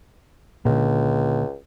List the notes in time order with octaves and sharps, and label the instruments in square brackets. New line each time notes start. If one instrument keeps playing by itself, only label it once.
[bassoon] C#2 [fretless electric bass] A#2 D3